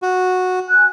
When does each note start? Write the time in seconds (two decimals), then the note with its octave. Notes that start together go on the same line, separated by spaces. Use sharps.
0.02 F#4
0.68 G#5 F#6